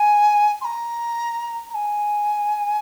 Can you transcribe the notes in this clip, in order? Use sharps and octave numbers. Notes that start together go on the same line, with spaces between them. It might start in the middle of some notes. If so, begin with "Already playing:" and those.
Already playing: G#5
C6
A#5
A#5
G#5